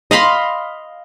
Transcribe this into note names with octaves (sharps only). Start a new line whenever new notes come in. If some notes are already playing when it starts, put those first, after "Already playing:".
D#5 F5 B5 C6